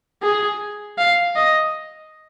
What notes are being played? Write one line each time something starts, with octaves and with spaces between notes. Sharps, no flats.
G#4
F5
D#5